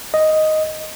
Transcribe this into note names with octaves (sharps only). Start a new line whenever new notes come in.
D#5